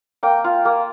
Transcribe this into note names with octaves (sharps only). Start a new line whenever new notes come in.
A#3 G5
F4
A#3